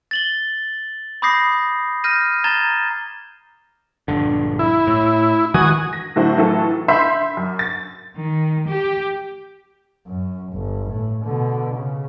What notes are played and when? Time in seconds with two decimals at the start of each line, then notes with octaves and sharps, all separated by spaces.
0.11 A6 F#7 G7
1.22 B5 D6 D#6 G6 A#6 C7
2.04 F6 G6 A#6 D#7
2.44 A#5 G#6 A6 E7 G7
4.08 A#1 G2 D3
4.59 E4
4.87 A2
5.54 D#3 E3 G#3 F#4 G#5 D#6
5.93 A#6
6.16 A2 D3 F#3 E4 F#4 C5
6.37 A2 E3 F#3 E4 F4 A4
6.88 E5 B5 C6 E6 G6 C7
7.37 F#2
7.59 A6
8.16 D#3
8.68 G4
10.07 F#2
10.53 G1
10.90 A2
11.22 B2 D3
11.74 C#3